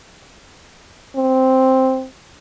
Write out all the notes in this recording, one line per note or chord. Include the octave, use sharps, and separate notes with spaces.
C4